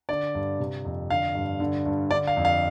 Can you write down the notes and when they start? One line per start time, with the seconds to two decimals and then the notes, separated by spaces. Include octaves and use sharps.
0.09 D3 D5
0.35 G2
0.59 C3
0.85 F2
1.10 D3 F5
1.35 G2
1.60 D3
1.86 G2
2.11 D3 D5
2.27 F5
2.37 F2
2.45 F5